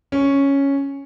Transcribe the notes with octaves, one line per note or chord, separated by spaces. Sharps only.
C#4